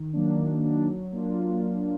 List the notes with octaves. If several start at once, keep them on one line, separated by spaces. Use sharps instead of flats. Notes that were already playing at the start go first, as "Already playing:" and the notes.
Already playing: D#3
F#3 A#3 D4
D#3
F#3 A#3 D4
F#3
A#3 D4 F4